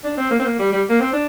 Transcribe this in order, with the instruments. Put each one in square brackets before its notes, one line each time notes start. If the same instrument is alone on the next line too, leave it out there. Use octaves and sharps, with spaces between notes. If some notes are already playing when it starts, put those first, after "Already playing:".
[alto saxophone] D4
C4
A#3
C4
A#3
G3
G3
A#3
C4
D4